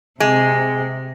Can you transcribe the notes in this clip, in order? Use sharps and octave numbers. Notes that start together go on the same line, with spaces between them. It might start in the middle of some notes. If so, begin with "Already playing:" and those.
C3 G#3